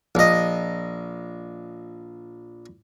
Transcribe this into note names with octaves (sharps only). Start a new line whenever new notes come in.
A#1 D#5